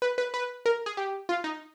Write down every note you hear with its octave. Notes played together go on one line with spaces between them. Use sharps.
B4
B4
B4
A#4
G#4
G4
F4
D#4